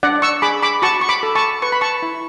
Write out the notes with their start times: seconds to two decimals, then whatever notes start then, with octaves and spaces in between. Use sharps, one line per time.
0.03 D4 D5 F#5
0.22 C#6 E6
0.42 G#4 B5 D6
0.63 B5 D6
0.82 F#4 A5 C#6
1.01 C#6
1.09 B5 D6
1.23 A4
1.36 A5 C#6
1.62 B4 C#6
1.72 B5
1.81 A5 C#6
2.02 E4